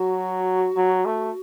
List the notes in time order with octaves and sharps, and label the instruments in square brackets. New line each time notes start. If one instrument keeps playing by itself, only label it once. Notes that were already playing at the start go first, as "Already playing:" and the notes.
Already playing: [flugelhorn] F#3 [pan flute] F#4
[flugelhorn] F#3
A3